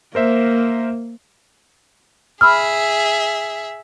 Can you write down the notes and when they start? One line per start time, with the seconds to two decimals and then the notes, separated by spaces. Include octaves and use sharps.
0.15 A#3 A#4 C5 E5
2.41 G#4 E5 B5 E6 F6